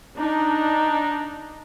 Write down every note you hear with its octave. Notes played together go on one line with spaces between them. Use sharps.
D4 D#4